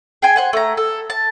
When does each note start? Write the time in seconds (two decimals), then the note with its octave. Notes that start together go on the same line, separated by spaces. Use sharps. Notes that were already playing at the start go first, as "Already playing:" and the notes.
0.22 G#4 G5 G#5
0.36 C5 F#5 G#5
0.53 A3 A#5
0.77 A4
1.10 A5